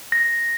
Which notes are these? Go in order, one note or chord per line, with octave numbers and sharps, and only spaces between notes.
A#6